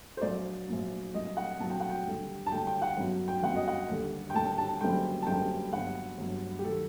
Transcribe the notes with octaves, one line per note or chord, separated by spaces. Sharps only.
C5
A#1 A#2 F#3 D5
A#1 A#2 F#3
C2 A#2 F#3 D#5
F#5
C2 A#2 F#3 A5
G5
F#5
G5
D#2 D3 G3
A5
D#2 D3 G3 G5
G5
F#5
G1 F#2 F#3
G5
G1 F#2 F#3 F#5
D#5
F#5
D#2 D3 G3
G5
D#2 D3 G3 A5
A5
F#1 F#2 D3 G3 G5
A5
F#1 F#2 D3 G3 G5
G1 G2 F#3 F#5
G1 G2 F#3
G4
D#3 F#3 A4